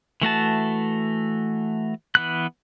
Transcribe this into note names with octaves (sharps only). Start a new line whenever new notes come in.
E3 A3 F#4 A5
E3 B3 F#6